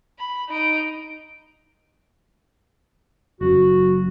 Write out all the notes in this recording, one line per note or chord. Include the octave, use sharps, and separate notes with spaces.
B5
D#4 D7
F#1 F#2 F#4